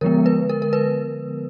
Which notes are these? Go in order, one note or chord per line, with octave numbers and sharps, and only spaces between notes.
D3 F3 G#3 B3 A#4
B4
A#4
A#4
B4